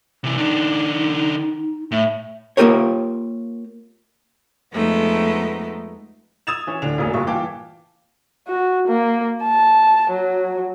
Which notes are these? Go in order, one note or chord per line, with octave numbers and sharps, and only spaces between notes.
C3 E3
D#3 D4 D#4
A2 E5
A#3 B3 F4 G4 A#4 C#5
F2 G#3 A3 B3 D#4
D#6 E6 G#6 A6 E7 F7
E3 C#4
D1 D4 F7
E1 A1 F#3 A#3 D#6
F#1 G2 F4 G4 G#4 C#6
A#2 E3 F5 G5 A5 D6
F#4
A#3
A5
F#3